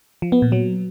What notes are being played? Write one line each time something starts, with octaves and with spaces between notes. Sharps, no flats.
F3
B3
A#2
F#3